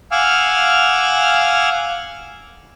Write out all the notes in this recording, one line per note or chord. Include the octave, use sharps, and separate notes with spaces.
F5 F#5 G#5 D6 E6 F6